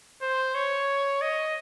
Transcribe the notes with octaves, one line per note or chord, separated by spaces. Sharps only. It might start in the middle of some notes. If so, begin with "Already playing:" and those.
C5
C#5
D#5